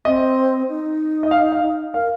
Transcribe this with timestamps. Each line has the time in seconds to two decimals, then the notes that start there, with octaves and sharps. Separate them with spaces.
0.05 C4 D#5
0.68 D#4
1.23 D#5
1.31 F5
1.52 F5
1.94 A#4 F5